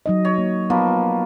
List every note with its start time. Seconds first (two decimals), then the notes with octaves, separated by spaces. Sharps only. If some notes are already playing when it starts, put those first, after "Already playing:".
0.06 F#3 D#4 D#5
0.25 C#5
0.38 A#3
0.70 F3 A#3 B3 B4